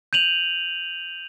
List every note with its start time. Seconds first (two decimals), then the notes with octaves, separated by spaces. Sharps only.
0.13 G6 D#7 F7 F#7